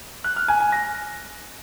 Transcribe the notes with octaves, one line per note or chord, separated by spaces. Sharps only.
F#6
F6
G#5
G#5
A#6